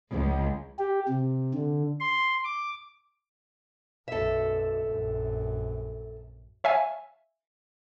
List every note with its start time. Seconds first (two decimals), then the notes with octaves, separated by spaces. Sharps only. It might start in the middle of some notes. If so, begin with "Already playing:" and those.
0.11 C#2
0.79 G4
1.09 C3
1.54 D3
2.00 C6
2.44 D6
4.08 B1 F#2 A4 E5
4.83 A#1 F#2
6.64 C#5 E5 F5 G#5